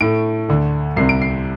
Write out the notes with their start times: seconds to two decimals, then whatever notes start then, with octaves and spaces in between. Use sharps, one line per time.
0.01 A2 A3 D7
0.49 D2 D3 A3
0.96 C2 C3 G3 C7
1.09 D7
1.22 C7